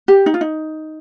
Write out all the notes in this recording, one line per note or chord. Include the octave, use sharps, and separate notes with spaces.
G4
D#4
F4
D#4